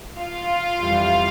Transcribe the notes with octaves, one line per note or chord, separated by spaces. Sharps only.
F4 F5
F2 E3 G3